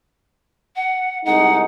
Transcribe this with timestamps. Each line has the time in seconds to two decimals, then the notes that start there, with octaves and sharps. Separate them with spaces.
0.76 F#5
1.25 C2 G#3 D#4 F#5